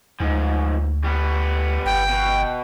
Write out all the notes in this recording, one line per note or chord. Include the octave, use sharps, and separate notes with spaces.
D2 G#2 F3
G3 B3
G1 G5
B2